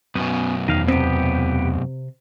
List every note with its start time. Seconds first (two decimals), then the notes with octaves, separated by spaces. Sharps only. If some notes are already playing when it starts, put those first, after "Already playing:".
0.15 F#2 B2 B3 C#4
0.68 E2 D#3 F5
0.88 C3 B3 C4 G4